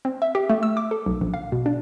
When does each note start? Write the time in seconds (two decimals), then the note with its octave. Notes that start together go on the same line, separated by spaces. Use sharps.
0.05 C4
0.22 E5
0.35 G4
0.49 A3
0.63 E6
0.77 D6
0.91 A4
1.06 B1
1.21 A#1
1.34 F5
1.52 B2
1.66 D4